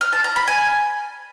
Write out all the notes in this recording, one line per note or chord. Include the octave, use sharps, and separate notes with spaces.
F6
A5
A#5
B5
G#5